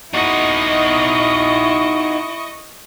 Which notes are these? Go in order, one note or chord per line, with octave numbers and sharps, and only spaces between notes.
D#4 E4 F#4 D#5 C#6